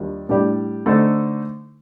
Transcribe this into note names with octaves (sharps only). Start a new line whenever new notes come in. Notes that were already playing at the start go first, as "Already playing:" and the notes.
Already playing: D#2 D#3 G3 D4 F4
A2 G3 D4 G4 D5
D3 A3 D#4 A4 C5